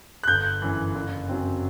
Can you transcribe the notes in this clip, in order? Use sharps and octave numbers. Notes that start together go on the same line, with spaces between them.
F#6
G1 G6
F#2 E3
F#1
F#2 F#3 C4